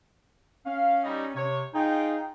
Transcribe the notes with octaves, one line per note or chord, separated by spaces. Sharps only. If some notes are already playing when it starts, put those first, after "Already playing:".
C#4 F5
G3 D#4
C3 C#5
D#4 F4 G#4 G5